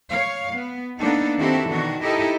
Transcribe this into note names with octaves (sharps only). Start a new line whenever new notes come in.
C#5 F5
B3
A#3 B3 D4 D#4 A4
D#3 C4 E4 F#4 G4 A4
B2 D#3 E3 D4 F#4
D#4 E4 G4 A4 A#4 D#5